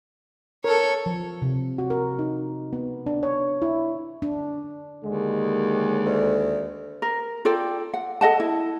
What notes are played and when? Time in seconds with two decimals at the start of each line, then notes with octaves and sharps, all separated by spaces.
0.64 A4 A#4 C#5
1.06 F3
1.42 C3
1.78 F#4
1.90 A#4
2.19 D#4
2.73 B3
3.06 D4
3.23 C#5
3.62 E4
4.22 D4
5.05 D#2 D3 G#3
6.05 D2
7.02 A#4
7.45 F4 A4 D5 G5
7.94 F#5
8.21 A4 D#5 F#5 A5
8.40 E4